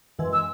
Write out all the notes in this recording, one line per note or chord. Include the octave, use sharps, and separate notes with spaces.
F#2 E3 G#3
E6